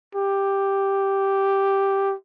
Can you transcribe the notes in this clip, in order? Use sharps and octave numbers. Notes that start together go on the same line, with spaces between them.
G4